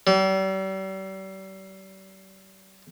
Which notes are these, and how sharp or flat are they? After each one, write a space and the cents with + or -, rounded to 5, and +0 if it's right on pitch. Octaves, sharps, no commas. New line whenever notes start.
G3 -40